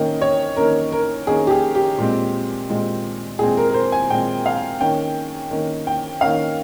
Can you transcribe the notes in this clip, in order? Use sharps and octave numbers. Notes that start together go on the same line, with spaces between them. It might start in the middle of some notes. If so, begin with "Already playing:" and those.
Already playing: D#3 A#3 C#4 D#5 G5
C#5
D#3 A#3 C#4 A#4
A#4
D#3 A#3 C#4 G#4
G4
G#4
G4
A#2 G#3 C4
A#2 G#3 C4
A#2 G#3 C4 G#4
A#4
A#4
C5
G#5
A#2 G#3 C4 G5
F5
D#3 A#3 C#4 G5
D#3 A#3 C#4
G5
D#3 A#3 C#4 F5